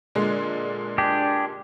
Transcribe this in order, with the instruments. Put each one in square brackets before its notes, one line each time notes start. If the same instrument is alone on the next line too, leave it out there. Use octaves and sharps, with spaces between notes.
[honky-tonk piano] A#2 D3 G#3
[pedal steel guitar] D4 G4 G#4